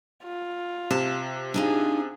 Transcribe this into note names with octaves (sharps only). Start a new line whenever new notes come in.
F4
C3 A5
D4 D#4 F4 G#4